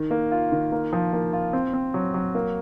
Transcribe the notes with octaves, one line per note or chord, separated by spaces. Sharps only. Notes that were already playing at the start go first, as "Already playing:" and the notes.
Already playing: D#3
A#3
F4
D#3
A#3
F3
A#3
F4
C4
C4
F#3
F#3
A#3